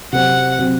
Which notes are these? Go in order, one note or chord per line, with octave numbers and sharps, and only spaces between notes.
C3 F#3 C4 F#5
C3 F#3 C4